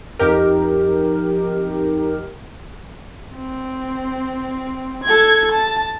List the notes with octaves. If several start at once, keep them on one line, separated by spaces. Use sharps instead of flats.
F2 D#4 G4 A#4
C4
A4 G#6
A5